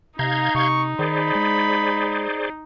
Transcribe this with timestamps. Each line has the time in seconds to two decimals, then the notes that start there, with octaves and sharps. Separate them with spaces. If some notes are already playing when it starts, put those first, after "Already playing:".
0.19 C3 D#4 F5 A#5 G6 G#6
0.55 C3 C#6
0.99 D#3 G#4 C5 D5 B5
1.35 G#3